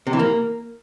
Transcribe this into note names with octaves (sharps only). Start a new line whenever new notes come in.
C3
E3
A#3